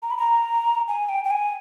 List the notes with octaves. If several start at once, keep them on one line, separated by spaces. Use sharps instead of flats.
A#5
B5
A#5
G#5
G5
G5
G#5